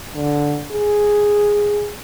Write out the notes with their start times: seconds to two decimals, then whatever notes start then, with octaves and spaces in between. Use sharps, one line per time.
0.15 D3
0.72 G#4